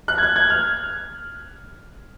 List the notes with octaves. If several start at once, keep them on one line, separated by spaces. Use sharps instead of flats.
F#6
G#6
F#6
G#6
F6